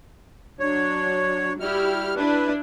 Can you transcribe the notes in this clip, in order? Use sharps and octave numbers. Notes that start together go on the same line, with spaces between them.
F#3 D4 C#5
G3 E4 F#4 G4 F6
D4 E4 B4